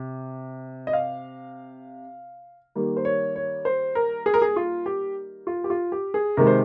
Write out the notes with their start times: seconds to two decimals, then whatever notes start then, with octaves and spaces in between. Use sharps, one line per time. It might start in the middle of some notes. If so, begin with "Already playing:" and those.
Already playing: C3
0.87 D#5
0.93 F5
2.75 D#3 G3 A#3
2.97 C5
3.05 C#5
3.36 C#5
3.65 C5
3.95 A#4
4.26 G#4
4.34 A#4
4.42 G#4
4.56 F4
4.86 G4
5.47 F4
5.64 G4
5.70 F4
5.92 G4
6.14 G#4
6.37 C3 D#3 G#3 A#4
6.47 C5